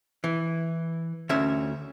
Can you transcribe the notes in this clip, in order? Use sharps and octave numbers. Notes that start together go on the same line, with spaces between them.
E3
D2 C#4 E5